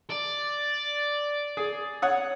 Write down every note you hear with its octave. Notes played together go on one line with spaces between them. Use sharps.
D5
G#4
C#5 F#5 D#6